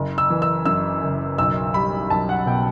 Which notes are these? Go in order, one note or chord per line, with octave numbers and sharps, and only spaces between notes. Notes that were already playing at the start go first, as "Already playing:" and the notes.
Already playing: F#1
E6
E3
E6
F#2 E6
F#1
B1 E6
G3 B5
B1 A5
F#5
B2 G5